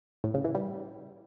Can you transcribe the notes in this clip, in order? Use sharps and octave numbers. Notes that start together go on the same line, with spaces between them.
A2
C#3
E3
G3